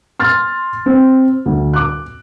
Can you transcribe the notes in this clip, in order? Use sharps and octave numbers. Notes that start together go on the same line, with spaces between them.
C6 F6 A6
C4
D2
D6 F#6